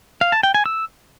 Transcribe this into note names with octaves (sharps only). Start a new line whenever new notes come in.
F5
A5
G5
G#5
E6